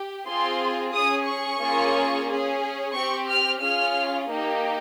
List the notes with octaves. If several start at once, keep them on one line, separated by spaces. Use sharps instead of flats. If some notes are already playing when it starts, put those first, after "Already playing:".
Already playing: G4
C4 F4 G#4 C6
C#4 G#4 D#6
C#6
A#3 C#4 F4 G#4
C#4 G#4
C4 G4 C#6
F6
C#4 F4 G#4 F6
A#3 D#4 G4